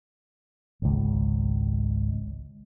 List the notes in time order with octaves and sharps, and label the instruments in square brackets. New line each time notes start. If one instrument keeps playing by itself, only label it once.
[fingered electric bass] G#1 C#2